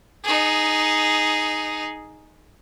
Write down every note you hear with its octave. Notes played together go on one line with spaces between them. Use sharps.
D#4 G#4